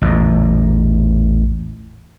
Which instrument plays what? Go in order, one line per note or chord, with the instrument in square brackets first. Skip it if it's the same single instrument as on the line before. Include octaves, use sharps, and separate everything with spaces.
[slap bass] A1 E2 A#2